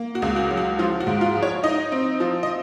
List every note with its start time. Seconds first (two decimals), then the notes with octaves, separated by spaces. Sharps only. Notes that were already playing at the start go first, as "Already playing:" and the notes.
Already playing: A#3
0.15 F#4
0.22 C#2
0.36 F#4
0.51 F#3
0.57 F#4
0.79 F3 F4
1.00 F#4
1.07 G#2
1.21 F4
1.35 F3
1.43 C#5
1.63 D#4 D#5
1.92 C4
2.20 F3
2.43 D#5